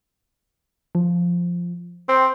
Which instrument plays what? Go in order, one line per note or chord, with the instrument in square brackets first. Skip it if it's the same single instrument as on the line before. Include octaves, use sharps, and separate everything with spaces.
[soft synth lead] F3
[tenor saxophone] C4 [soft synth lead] G5